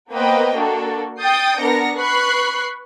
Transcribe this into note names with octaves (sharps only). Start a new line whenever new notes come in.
A#3 B3 B4 C5 D#5 G5
A#3 D4 F#4 A4
G5 D#6 G6 A6 C7
B3 D4 A#4 A#6 C#7
B4 B5 C#6 F#6 C7